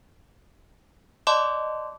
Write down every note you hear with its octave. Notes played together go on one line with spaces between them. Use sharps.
D5 D#5 A5 C6 D6